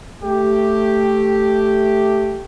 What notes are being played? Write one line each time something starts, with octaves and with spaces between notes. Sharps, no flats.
A3 G4